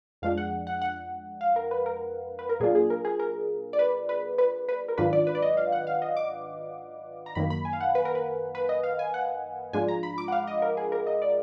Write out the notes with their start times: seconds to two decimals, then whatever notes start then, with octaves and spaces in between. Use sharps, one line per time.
0.22 F2 F3 G#3 D4 F5
0.38 F#5
0.67 F#5
0.82 F#5
1.41 F5
1.56 A#4
1.71 B4
1.86 A#4
2.39 B4
2.49 A#4
2.60 A#2 F#3 A#3 D4 F4 G#4
2.75 G#4
2.90 A#4
3.05 G#4
3.19 A#4
3.73 D5
3.79 B4
4.09 B4
4.38 B4
4.69 B4
4.88 A#4
4.98 G#2 D#3 F#3 D4 F4 B4
5.13 D5
5.27 B4
5.35 D5
5.42 D#5
5.57 F5
5.72 F#5
5.87 F5
6.02 D#5
6.17 D6
7.26 A#5
7.35 F#2 D#3 F#3 A#3 B5
7.50 B5
7.65 G#5
7.73 F5
7.81 F#5
7.95 B4
8.05 A#4
8.15 B4
8.55 B4
8.69 D#5
8.83 F5
8.99 G#5
9.14 F#5
9.73 G#2 F3 G#3 D4 F4 G#5
9.88 A#5
10.03 B5
10.18 D6
10.28 F#5
10.32 F5
10.47 D#5
10.62 A#4
10.77 G#4
10.92 A#4
11.07 D#5
11.22 D5